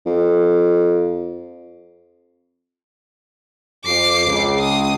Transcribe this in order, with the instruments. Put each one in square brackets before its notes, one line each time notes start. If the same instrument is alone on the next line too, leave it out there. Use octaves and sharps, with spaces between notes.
[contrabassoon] F2
[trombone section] F2 [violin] D6 C7
[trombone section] C#2
[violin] D#6